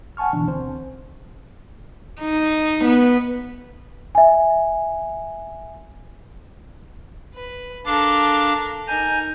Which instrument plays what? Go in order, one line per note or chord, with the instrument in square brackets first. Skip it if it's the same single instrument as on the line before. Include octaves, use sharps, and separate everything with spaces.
[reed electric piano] F#5 G#5 A5 C#6 F6
B2 D3 E3 D4
D2 C4 C5
[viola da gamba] D#4
B3
[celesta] E5 G#5
[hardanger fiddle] B4
[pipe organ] D4 F5 D6 [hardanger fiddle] A4 A#4
[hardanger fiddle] D#4 A#4 [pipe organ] G#5 G6